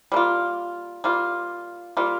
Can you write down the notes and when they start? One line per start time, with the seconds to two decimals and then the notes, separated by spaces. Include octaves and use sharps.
0.12 G3 A#3 F4
1.04 G3 A#3 F4
1.97 G3 A#3 F4